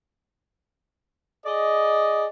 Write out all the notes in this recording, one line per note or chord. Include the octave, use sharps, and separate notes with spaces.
G#4 D5 D#5